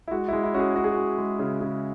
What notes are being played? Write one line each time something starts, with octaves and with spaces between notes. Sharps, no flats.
E4
G#3 F#4
G#3 E4
E4
C#4 F#4
G#4
C#4 F#4
G#4
G#3 F#4
G#3
C#3
C#3